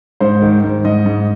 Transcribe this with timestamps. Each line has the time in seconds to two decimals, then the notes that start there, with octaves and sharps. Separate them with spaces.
0.20 G#2 C5
0.42 D#3
0.63 G#2
0.84 G#2 D#5
1.06 G#2